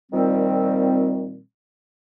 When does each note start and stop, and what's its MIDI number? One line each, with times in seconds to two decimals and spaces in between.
0.12 1.39 46
0.12 1.39 51
0.12 1.39 53
0.12 1.39 55
0.12 1.39 60